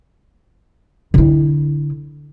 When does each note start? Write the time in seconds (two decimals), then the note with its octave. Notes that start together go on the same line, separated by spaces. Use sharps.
1.14 D3 E4